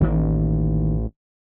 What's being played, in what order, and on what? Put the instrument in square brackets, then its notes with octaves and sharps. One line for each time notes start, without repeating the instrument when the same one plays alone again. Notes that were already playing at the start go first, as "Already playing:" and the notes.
[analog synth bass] A1 [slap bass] D2 D#3 A#3